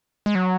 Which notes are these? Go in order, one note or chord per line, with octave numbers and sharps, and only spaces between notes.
G#3
F#3